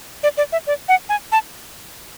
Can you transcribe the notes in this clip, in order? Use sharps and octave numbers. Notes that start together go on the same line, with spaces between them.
D5
D5
E5
D5
F#5
G#5
A5